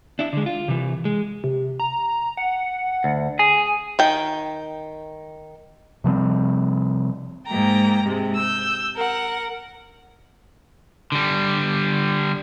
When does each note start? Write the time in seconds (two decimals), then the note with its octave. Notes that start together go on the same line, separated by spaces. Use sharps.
0.19 D4 E4
0.33 D3 G#3
0.46 F4
0.68 C3 E3
1.05 G#3
1.44 C3
1.80 A#5
2.37 F#5
3.04 D2
3.39 G#4 G#5
3.99 D#3 G5
6.04 C3 F3 G3 C4
7.46 G#2 A#3 G5 A#5
8.04 G#2 C3 G#3
8.36 E6 G6
8.95 A#4 F#5
11.12 D3 G3